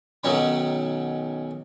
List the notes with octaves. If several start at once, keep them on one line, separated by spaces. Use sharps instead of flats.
B1 D#3 F#3 C#4 B5